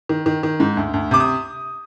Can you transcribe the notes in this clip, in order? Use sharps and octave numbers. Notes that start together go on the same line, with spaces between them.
D#3
D#3
D#3
G#2
D2
D2
C3 D6
D#6